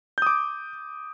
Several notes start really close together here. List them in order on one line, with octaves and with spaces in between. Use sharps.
G6 D#6 D6